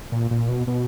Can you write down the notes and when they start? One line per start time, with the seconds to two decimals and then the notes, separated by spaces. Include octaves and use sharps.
0.12 A#2
0.31 A#2
0.49 B2
0.67 B2